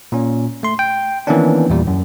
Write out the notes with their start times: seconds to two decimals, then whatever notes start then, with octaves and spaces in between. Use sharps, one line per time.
0.12 A#2 C#4
0.63 A3 C6
0.79 G5
1.27 D#3 E3 A#3 B3 C#4 D4
1.70 E2 A#2 G3
1.87 F#2